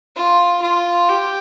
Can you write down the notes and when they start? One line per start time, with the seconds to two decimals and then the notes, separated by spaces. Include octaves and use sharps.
0.16 F4
0.62 F4
1.09 G4